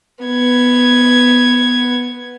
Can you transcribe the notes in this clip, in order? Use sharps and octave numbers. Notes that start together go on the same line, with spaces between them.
B3 G#6